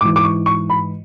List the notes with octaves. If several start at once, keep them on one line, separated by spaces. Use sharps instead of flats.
G#2 E3 D6
D6
C#6
C#6
B5